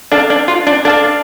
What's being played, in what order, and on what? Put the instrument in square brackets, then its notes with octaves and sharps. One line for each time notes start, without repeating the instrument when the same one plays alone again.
[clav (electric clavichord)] D4 [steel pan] A4 F5 A5
[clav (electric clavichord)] D4
F4
D4
[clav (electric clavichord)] D4 [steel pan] A4 F5 A5